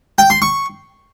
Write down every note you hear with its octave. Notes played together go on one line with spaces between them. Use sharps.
G5
C6
C#6